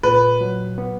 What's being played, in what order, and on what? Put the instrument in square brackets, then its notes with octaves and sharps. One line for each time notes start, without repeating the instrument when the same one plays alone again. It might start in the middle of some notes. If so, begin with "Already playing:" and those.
[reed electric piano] A#2 [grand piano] B4
[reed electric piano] F#3
B3